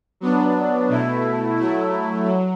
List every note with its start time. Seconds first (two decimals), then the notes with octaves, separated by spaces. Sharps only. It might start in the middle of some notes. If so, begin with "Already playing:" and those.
0.21 F#3 B3 D4
0.89 B2 A3 E4
1.57 F#3 A3 E4
2.25 F#3